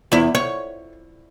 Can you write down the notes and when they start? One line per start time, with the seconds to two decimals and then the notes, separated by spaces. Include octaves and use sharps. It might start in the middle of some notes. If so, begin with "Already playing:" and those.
0.12 E2 E4
0.35 C#5